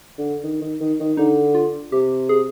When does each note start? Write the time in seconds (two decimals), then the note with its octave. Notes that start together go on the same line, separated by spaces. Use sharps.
0.18 D3
0.43 D#3
0.61 D#3
0.80 D#3
1.00 D#3
1.17 D3 D#4
1.55 F4
1.92 C3 G4
2.29 G#4